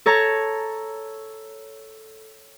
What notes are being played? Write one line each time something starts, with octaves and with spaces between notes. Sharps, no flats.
A4 C#5 A#5